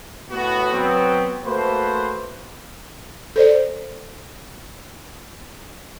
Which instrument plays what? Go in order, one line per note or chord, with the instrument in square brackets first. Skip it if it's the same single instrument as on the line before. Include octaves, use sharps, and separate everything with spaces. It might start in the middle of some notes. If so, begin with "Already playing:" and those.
[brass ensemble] A2 B3 F#4
F#3 B3 C4
A3 A#3 F#4 B4 C5
[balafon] A4 C5 D5